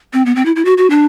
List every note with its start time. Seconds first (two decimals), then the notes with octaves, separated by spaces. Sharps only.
0.13 C4
0.26 B3
0.36 C4
0.46 E4
0.56 E4
0.65 F#4
0.78 F#4
0.90 D4